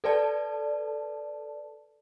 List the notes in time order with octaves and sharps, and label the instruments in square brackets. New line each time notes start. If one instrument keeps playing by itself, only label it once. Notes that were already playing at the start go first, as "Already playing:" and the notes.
[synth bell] A4 B4 D5 A5